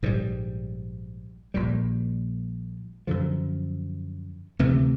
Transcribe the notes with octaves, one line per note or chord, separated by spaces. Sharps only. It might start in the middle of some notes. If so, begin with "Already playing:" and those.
A#1 G#2 E3 G3
A#1 A#2 G3
F#2 D3 F3
D2 C3 E3 A3